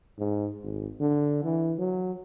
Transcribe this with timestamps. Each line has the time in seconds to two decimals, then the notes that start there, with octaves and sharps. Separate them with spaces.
0.18 G#2
0.63 G#1
1.00 D3
1.44 E3
1.79 F#3